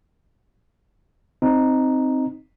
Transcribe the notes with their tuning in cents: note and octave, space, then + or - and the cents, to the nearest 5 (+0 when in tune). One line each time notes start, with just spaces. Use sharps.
C4 +0 D#4 +0